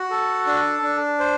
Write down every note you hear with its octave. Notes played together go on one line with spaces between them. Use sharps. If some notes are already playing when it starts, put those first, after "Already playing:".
Already playing: F#4
A4
D4
D4
C5